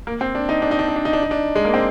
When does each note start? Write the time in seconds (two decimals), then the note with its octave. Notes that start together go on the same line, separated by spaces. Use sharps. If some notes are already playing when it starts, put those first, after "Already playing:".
0.07 A#3
0.21 C4
0.35 D4
0.49 D#4
0.62 D4
0.71 D#4
0.79 D4
0.88 D#4
0.96 D4
1.05 D#4
1.13 D4
1.23 D#4
1.31 D4
1.55 G#3
1.65 A#3
1.74 C4